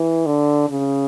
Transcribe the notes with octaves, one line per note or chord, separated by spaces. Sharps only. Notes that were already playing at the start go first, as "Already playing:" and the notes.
Already playing: E3
D3
C#3